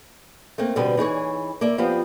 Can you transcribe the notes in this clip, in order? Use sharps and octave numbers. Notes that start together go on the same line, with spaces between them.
A3 A#3 C4
B2 D3 G3 C4 B4
E3 D#4 G#4 C#5
A#3 D5 E5
F3 B3 C4 G4